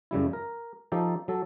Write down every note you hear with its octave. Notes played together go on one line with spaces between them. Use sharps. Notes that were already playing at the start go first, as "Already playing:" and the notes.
F#2 C#3 G3 E4
A#4
F3 D#4 G4 A4
F#3 A4